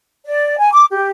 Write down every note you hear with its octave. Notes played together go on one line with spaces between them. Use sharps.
D5
G#5
D6
G4